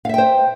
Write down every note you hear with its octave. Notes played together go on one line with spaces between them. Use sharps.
C5 E5 F5 G5